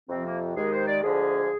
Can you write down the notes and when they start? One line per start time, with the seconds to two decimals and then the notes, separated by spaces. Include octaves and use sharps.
0.09 F2 C3 F3 C4
0.24 A#3
0.55 D#2 D#3 G#3 G#4
0.71 C5
0.87 D5
1.02 D2 D3 F3 G#3 G#4